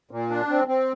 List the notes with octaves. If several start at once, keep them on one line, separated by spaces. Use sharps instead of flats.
A#2
D4
C4
C4